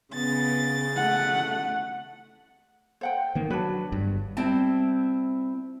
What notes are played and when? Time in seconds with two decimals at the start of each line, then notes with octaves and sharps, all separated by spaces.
0.13 C#3 B3 A6
0.96 A3 F#5
3.01 C5 F#5 G5
3.35 D#3 A#3
3.50 F#3 D4 B4
3.92 G1 G2
4.37 G3 C4 E4 G5 A5